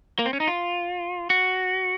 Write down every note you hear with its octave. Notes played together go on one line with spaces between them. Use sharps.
A#3
C4
C#4
D#4
F4
F#4